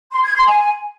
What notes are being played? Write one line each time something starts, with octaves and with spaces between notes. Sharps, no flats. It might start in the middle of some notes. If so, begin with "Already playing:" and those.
C6
G#6
C6
G#5